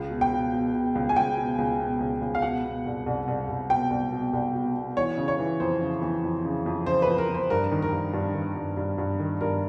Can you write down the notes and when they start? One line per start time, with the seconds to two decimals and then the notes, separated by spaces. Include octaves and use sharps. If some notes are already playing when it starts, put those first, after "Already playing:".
Already playing: C#2
0.10 B2
0.21 G5
0.32 B2
0.52 B2
0.74 B2
0.95 C#2
1.09 G#5
1.16 C#2 G5
1.37 B2
1.58 C#2
1.79 B2
2.00 C#2
2.21 C#2
2.35 F5
2.42 B2 F#5
2.64 B2
2.86 C2
3.06 C2
3.28 C2
3.49 C2
3.70 B2 G5
3.91 C2
4.12 B2
4.33 C2
4.54 B2
4.76 B2
4.97 E3 C#5
5.17 C#3
5.28 C#5
5.39 E3
5.60 F2 C5
5.81 C#3
6.02 E3
6.24 F2
6.45 C#3
6.66 F2
6.86 C#3 C5
7.02 B4
7.08 F2
7.18 A#4
7.29 F2
7.34 C5
7.50 G2 A#4
7.72 D#3
7.82 A#4
7.92 G2
8.13 G2
8.34 D#3
8.56 G2
8.77 G2
8.98 G2
9.19 D#3
9.41 G2 A#4